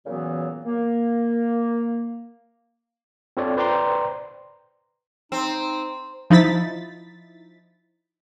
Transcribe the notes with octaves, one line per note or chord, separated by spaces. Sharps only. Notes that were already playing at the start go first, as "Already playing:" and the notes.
A#2 C#3 E3 F#3 B3 F#4
A#3
C4 F4 A4 C#5 D5
B4 C5 D5 G5 A#5 C6
C4 D#4
F3 D#4 E4 A6 B6